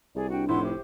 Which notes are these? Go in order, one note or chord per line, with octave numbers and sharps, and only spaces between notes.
C2 G#4 D5
D4 F#4 G5
F1 A2 E4 F#5 C6
G4 C5